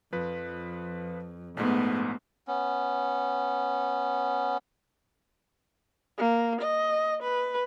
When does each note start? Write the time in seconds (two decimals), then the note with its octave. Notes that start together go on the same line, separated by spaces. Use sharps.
0.12 F2 F3 B4
1.57 A#1 G#2 A3 B3
2.48 B3 C#4
6.18 A#3
6.61 D#5
7.23 B4